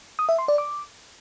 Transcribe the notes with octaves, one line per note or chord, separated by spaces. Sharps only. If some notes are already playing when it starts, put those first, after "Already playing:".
D#6
E5
C6
D5
D6